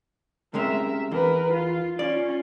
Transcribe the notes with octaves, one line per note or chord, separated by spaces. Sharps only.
C3 G#3 C#4 A#4 E5
E2 A#4 B4
F4
C#4 F4 D5